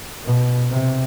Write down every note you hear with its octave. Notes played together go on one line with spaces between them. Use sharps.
B2
C3